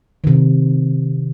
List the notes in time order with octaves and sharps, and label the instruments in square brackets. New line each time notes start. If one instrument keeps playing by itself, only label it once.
[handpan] C3 D#3